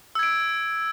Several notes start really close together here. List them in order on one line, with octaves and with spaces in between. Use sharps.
E6 G#6 D7